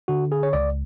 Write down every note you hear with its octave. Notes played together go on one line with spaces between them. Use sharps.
D3 F#4
G#4
C#5
C#2 D5